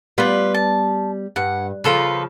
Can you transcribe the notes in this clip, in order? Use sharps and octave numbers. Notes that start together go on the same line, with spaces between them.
G3 B3 F4 B4
A5
G2 F#5
C#3 F3 F4 A4 B4